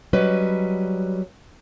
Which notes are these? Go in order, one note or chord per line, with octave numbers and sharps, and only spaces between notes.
F#3 G3 C#4 B4 D#5